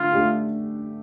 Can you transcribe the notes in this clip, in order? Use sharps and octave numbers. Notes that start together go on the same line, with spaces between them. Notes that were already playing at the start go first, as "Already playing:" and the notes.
Already playing: D3 A3 D4 F4
A3 D4 G4